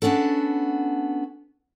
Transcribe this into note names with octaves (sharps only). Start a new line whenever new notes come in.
B3 C#4 D4 F#4 A4